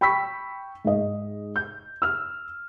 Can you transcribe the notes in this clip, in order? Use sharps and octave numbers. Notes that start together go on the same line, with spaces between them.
G5 B5 C#6 E6 B6
G#2 D#5
G6
E6 F6